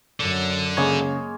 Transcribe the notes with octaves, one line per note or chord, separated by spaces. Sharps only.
F#2 D3 F#3
C#3 G#3 A#3 C#5 G#6